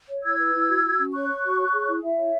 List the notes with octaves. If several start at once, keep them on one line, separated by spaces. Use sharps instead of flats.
C#5
E4 E6 G#6
B4
E4
F#4
F#4
C#4
C#5 C#6 F#6
C#5
F#4
C#5
G#4
E4
E4 E5
C#5